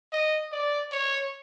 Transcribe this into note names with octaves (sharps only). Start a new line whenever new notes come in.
D#5
D5
C#5